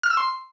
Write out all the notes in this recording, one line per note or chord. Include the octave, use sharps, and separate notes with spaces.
F6
E6
C6